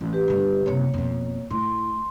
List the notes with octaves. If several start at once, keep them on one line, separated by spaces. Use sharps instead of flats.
A1
G4 B4
G1 D3
F#1 C3 A#3 C#5
F2 B2
A2 C6